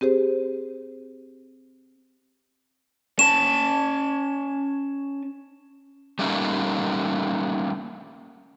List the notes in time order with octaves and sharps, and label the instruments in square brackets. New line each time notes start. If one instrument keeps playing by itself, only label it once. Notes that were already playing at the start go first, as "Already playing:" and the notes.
[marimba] C4 G4 G#4 C5
[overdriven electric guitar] C#4 A5 [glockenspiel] E7
[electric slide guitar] G3 A3 A#3 C#4 D#4